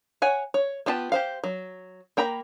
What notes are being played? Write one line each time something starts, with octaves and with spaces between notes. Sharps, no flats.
C#5 F#5 G#5
C#5
B3 D4 F4 G4 A5
G4 C5 F5
F#3
A#3 G5 A#5 B5